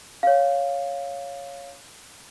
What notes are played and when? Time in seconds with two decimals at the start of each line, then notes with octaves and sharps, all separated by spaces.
0.23 C#5 F5